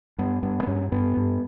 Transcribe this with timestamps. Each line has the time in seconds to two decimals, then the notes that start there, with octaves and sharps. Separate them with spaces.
0.18 G2 B3
0.43 G2 B3
0.63 B3
0.67 G2 C#4
0.92 G2 B3
1.17 G2